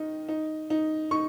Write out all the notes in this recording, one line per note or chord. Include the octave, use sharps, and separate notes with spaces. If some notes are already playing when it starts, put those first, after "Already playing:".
Already playing: D#3 D#4
D#4
D#4
D#4 C#6